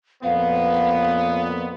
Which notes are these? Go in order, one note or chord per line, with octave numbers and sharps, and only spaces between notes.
F2 A#2 B3 F5